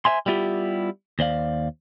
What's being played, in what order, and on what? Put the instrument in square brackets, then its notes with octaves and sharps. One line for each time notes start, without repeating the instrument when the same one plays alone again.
[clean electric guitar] C5 C#5 E5 G#5 C6
G3 B3 E4 F4 G4
D#2 C5 D5 F5